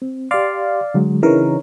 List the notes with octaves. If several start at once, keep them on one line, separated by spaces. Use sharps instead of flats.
C4
G4 D5 F5 C6
D3 F#3 G#3
C#3 E3 D4 D#4 A#4 C#5